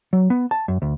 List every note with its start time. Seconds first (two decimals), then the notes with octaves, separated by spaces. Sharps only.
0.13 F#3
0.30 B3
0.51 A5
0.68 F#2
0.82 D2